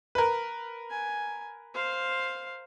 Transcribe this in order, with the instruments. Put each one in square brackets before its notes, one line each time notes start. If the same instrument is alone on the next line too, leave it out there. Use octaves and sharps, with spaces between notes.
[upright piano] A#4 B4
[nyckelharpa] G#5
C5 F5